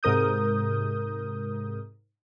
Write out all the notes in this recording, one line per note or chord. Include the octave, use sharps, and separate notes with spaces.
G#2 C3 A#4 D#6 G6